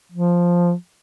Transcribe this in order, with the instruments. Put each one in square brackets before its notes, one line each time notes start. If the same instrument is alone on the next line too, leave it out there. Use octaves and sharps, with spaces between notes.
[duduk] F3